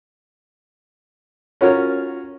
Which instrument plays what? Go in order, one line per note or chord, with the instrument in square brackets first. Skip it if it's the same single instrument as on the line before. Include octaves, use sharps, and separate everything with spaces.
[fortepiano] C#4 F4 F#4 A#4 C#5